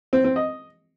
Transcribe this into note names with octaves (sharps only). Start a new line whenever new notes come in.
C4
C4
D#5